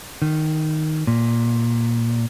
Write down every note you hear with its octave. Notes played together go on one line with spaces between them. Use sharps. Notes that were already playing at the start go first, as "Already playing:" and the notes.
D#3
A#2